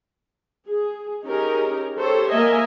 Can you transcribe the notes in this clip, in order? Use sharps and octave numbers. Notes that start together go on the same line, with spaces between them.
G#4
C#4 D#4 G4 G#4 A#4
G4 A4 C5 C#5
A#3 A#4 D#5 E5 G#5